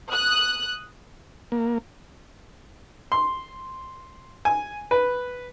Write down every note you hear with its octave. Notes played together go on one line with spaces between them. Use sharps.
D#6 F#6
A#3
C6
G#5
B4